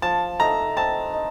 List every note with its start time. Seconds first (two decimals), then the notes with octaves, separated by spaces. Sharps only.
0.02 F3 A5
0.39 A3 D#4 A4 A#5
0.77 C4 A5
1.13 D#4